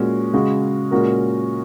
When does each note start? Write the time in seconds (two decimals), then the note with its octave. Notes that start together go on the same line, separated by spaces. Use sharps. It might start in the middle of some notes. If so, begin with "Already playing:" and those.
Already playing: A#2 G#3 C#4 F#4
0.34 C#3 G#3 F#4
0.91 A#2 G#3 C#4 F#4 A#4